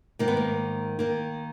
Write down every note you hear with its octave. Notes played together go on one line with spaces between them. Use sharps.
G#2 D#3 A#3
B3
A#3
D#3 A#3